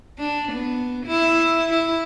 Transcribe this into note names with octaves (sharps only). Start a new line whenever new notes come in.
D4
B3
E4
E4